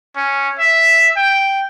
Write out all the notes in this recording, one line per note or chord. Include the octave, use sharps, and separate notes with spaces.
C#4
E5
G5